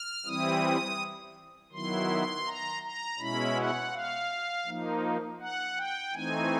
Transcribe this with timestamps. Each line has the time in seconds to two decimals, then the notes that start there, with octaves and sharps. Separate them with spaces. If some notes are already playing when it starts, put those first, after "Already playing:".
Already playing: F6
0.26 E3 G3 C4 E4 D#6
1.72 D#3 F#3 B3 E4 C6
2.46 A#5
2.83 A#5
3.19 B2 G#3 C#4 E4 B5
3.56 F#5
3.93 F5
4.66 F3 A#3 D#4
5.40 F#5
5.76 G5
6.12 E3 A3 C4 D#4 G#5